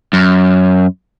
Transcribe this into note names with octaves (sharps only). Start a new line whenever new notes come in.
F#2